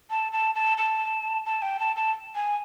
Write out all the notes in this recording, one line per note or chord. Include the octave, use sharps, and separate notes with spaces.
A5
A5
A5
A5
A5
G5
A5
A5
G#5